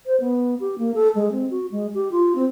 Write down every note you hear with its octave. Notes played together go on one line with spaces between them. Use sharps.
C5
B3
G4
A#3
A4
G#3
C4
F#4
G#3
G4
F4
C4